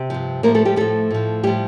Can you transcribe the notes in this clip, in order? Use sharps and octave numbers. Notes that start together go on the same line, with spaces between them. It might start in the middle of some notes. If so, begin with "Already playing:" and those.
Already playing: C3 C4
G2 F3
A2 F3 A#3 A#4
A3 A4
G3 G4
A2 F3 A3 A4
A2 F3
A2 F3 G3 G4